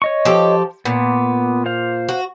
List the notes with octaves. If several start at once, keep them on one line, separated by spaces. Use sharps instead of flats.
C#5 D#5 C#6
F3 G4 A4
A#2 B3
C5 F5
F#4